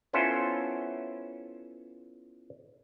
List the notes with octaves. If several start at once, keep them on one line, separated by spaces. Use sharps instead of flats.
B3 C#4 E4 F4 A4 C5